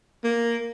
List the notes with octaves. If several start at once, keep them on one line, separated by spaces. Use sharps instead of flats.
A#3